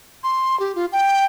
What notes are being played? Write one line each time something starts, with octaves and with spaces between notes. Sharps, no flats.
C6
G4
F4
G5